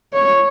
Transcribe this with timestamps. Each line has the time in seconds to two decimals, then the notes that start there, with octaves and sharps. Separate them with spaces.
0.13 C#5